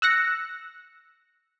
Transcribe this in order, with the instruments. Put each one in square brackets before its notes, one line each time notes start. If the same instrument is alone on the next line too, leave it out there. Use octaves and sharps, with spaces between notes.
[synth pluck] E6 F#6 A#6 C#7